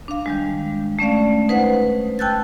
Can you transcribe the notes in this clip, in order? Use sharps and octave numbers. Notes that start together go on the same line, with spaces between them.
D4 F5
D#3 G3 G#3
A3 C#4 D5 F5
D#4 B4 C5 F#5
G5 A5 E6 F#6 G6 A6